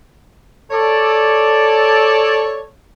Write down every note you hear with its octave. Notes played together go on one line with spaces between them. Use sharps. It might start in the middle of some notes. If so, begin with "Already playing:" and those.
A4 C#5 D5